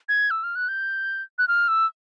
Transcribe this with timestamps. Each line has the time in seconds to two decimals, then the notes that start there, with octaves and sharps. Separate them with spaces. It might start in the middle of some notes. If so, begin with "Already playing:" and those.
0.09 G#6
0.31 E6
0.43 F6
0.55 F#6
0.68 G6
1.38 F#6
1.48 F6
1.68 E6